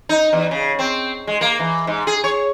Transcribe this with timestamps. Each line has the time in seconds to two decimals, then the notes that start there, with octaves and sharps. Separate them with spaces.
0.09 D#4
0.33 E2
0.51 C#3
0.79 C4
1.27 G#3
1.41 A#3
1.59 E3
1.87 G#2
2.07 G#4
2.24 C#5